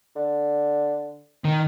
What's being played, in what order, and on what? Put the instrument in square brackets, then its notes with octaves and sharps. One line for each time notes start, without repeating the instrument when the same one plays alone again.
[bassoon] D3
[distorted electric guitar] D#3 A#4